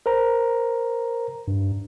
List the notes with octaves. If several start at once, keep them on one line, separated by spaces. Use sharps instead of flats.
A#4 C5 A#5
G2